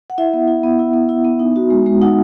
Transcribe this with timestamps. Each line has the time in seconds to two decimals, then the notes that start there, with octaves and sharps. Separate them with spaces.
0.10 F#5
0.18 E4 E5
0.33 B3
0.48 E4
0.63 B3
0.79 E4
0.94 B3
1.09 E4
1.25 B3
1.39 D#4
1.56 F#4
1.70 G#3
1.86 G#3
2.02 D#4 F#5